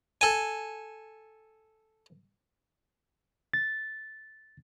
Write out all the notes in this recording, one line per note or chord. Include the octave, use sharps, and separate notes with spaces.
A4 G#5
A6